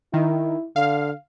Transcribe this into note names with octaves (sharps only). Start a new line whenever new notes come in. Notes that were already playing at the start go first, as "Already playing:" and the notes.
D#3 E4
D3 F5